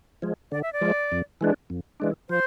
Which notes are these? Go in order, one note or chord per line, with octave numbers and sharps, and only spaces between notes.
F3 G#3
D3 D5
E5
D5
F3 G#3
F2
E3 G#3 D4
F2
E3 G#3 D4
F3 C5